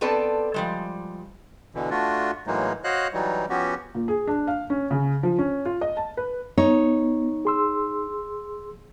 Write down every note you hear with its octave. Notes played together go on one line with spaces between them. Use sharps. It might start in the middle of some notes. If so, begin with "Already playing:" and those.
B3 C4 A4 B4 D5 A5
F3 G3 G#3
B2 D3 E3
A3 D4 F4 F#4
A2 E3 F#3 G#3 A#3 D#4
F#4 C5 C#5 D#5 F5 F#6
E3 F#3 G3 D#4
F3 B3 C#4 F#4 G4
A#2
G#4
D4
F5
C#4
C#3
F3
C#4
F4
D#5
A5
B4
B3 D#4 C#5
G#4 C6 E6